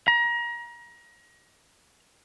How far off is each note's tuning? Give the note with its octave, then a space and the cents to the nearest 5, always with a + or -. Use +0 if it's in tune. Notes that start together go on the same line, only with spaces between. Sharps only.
A#5 +30